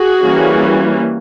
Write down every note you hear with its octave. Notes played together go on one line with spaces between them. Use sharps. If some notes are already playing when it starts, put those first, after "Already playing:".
Already playing: F#4 G#4
E3 G3 A#3 C#4